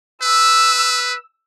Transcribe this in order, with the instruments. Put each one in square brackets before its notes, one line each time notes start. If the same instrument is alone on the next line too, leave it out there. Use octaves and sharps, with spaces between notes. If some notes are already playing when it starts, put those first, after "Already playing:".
[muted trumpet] B4 [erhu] E6